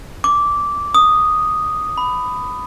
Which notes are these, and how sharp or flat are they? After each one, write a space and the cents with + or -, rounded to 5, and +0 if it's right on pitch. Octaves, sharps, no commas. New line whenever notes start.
D6 -10
D#6 -5
B5 +15